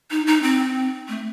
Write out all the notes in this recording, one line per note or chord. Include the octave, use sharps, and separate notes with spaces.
D#4
D#4
C4
A3